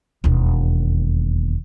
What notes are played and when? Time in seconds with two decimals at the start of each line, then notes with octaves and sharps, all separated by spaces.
0.24 E1 D#2